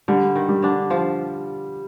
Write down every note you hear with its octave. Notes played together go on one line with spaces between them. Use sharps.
D3 G3
D#3
G3
D3 D4
F3 F4